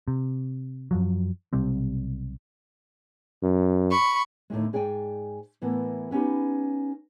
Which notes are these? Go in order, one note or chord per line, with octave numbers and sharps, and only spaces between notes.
C3
F#2 F3 F#3
B1 C3 G3 C4
F#2
B5 C#6
D#2 A2 D3 G#3
G#2 G#4 D5 G5 G#5
A2 E3 A#3 B3
B3 C#4 D#4 G4 B4